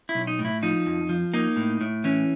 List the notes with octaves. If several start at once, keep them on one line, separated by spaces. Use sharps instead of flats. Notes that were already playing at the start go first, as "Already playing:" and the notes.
E4
B1
D#4
A2
E4
F3 D#4
F2
F3
A#3 D#4
A2
A2
E3 C#4